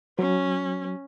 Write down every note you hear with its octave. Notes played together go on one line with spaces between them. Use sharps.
F#3 C#4